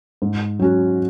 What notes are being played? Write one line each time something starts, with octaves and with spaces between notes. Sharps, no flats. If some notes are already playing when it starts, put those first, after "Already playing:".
G#2
F#3 C#4 F#4